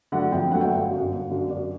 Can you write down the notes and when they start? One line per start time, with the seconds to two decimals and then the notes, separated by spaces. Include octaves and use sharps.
0.12 D3 F#3 A3 F#5
0.32 F2 G5
0.52 D3 F#3 A3 F#5
0.61 G5
0.70 G1 F#5
0.91 F#2 D3
1.11 G1
1.31 F#2 D3
1.50 F#2 D5